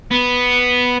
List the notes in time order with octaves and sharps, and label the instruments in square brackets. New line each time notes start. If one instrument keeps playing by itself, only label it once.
[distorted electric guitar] B3